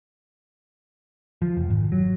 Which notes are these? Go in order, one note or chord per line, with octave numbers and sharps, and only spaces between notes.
F3
F1
G#1
F#3